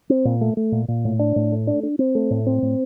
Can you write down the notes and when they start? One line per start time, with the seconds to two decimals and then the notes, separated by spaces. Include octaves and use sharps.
0.10 C4
0.25 A#2
0.41 A3
0.57 A3
0.72 A#2
0.88 A#2
1.05 A2
1.19 D4
1.36 A2
1.52 A3
1.67 D4
1.83 D4
1.99 C4
2.15 A3
2.30 A2
2.47 C4
2.62 A2